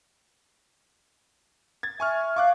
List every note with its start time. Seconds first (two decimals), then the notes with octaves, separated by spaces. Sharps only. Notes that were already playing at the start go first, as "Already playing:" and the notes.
1.83 G#6 A6
2.00 E5 G#5 C#6 F6
2.36 F5 C#6 D6 F#6